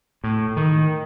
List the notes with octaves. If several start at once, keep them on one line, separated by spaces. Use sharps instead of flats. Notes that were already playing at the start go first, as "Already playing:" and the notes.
A2
D#3